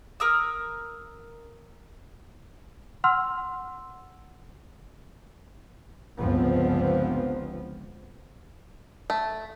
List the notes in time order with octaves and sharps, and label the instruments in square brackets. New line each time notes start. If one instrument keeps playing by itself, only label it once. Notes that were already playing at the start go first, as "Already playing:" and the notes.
[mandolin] A#4 D#6 E6
[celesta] F#5 C6 E6 F6
[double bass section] G1 C#2 F3 B3 C4
[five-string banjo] A3